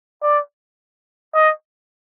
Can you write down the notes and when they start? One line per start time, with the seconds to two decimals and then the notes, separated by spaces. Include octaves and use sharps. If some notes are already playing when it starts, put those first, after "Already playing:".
0.22 D5
1.34 D#5